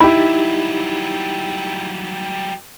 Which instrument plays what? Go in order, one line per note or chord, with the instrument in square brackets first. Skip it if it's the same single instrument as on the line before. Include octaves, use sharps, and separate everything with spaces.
[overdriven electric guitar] F#3 G3 [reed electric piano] D#4 G4 [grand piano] E4 [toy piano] B5